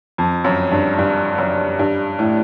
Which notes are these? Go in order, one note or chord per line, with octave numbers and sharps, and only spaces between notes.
F2
F#2
G2
G2
F#2
G2
A2